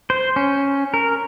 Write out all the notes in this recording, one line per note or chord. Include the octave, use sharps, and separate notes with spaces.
C5
C#4
A#4